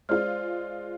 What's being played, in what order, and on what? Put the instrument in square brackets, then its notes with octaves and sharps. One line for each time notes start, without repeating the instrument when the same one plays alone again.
[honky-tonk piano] G#3 F4 [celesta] C5 D5 F6